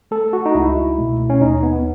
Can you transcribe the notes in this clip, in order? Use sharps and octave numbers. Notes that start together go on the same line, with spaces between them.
A3 A4
F#4
D#4
C#2 E4
B2 A3
C#4
D#2 D#4
B3